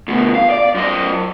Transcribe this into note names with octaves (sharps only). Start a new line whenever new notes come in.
D2 B2
F5
D5
F#2 D#5